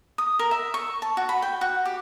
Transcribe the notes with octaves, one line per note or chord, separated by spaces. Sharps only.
D#6
A#4
E5
C#6
A5
F#4
B5
G5
F#4
G4